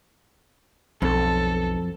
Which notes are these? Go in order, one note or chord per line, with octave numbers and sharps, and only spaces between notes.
B1 F2 A4